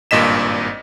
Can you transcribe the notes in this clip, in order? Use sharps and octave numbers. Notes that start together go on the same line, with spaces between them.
G#1 G2 A#2 D#5 B6 E7